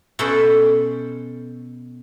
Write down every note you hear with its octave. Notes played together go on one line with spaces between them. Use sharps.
B2 C#4 A4 B4 C5 G5